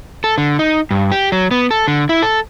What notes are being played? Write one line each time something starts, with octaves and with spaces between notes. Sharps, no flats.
A4
D3
D#4
G2
G4
F#3
B3
A4
D3
E4
A4